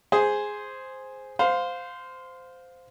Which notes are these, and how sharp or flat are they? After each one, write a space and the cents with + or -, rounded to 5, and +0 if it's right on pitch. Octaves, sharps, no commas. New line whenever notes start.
G#4 +0 C5 +0
C5 -15 F5 +15